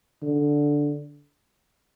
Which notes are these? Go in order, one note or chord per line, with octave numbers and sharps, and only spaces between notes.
D3